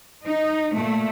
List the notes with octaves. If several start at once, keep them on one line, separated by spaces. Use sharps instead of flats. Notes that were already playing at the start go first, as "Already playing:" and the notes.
D#4
A#2 A3